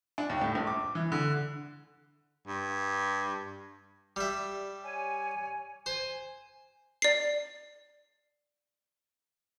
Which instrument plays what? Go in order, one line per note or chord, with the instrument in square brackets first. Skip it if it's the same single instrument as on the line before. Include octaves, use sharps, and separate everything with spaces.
[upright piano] D4
D#2
A2
A#1
D6
E3
D3
[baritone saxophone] G2
[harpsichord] G3 E5
[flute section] C#5 G#5
[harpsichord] C5 [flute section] G#5
[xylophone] D5 C7